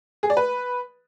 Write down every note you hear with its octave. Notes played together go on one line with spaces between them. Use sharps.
G#4
D5
B4